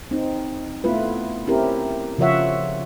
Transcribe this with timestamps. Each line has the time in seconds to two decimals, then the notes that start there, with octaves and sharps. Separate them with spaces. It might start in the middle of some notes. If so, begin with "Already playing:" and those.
0.11 C4 D#4
0.84 A3 B3 E4 F4 B4
1.47 C4 C#4 E4 G4 A#4
2.18 C#3 F3 F4 C#5 E5 F#5